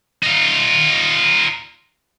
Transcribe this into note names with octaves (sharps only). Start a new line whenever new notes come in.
D#4 F4